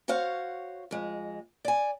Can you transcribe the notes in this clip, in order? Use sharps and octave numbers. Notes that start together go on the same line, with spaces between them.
F#4 C5 C#5 F5 F#5
F2 G#3
D5 G#5